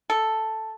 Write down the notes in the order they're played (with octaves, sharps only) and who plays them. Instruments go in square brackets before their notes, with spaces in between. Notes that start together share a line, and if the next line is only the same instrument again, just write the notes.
[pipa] A4